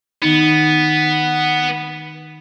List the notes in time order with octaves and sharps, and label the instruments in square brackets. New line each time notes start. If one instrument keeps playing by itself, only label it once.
[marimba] D#3 D#4 [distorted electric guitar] B3